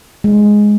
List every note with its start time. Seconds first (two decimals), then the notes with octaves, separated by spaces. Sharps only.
0.24 G#3